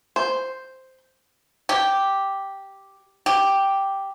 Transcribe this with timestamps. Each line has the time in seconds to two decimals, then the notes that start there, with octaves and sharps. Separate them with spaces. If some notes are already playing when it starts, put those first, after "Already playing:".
0.16 C5
1.69 G4
3.26 G4